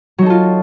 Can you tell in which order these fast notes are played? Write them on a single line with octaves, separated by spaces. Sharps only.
F#3 D#4 A4 F4